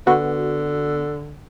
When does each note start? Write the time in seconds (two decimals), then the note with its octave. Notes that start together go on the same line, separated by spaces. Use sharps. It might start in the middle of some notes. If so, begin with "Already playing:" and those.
0.07 D3 B3 F#4